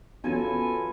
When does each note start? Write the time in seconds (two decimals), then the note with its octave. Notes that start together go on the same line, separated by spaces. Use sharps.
0.24 E2 F#3 C#4 F4 A4 B4 G#5